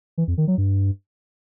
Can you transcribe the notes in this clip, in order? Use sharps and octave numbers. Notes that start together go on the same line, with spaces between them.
E3
F2
D#3
F#3
G2